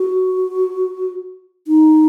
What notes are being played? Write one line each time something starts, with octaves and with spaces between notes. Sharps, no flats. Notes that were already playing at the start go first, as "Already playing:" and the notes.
Already playing: F#4
D#4